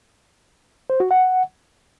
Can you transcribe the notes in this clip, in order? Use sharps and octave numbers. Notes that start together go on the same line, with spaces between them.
C5
F#4
F#5